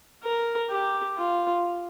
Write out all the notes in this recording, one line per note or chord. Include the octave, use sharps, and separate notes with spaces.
A#4
G4
F4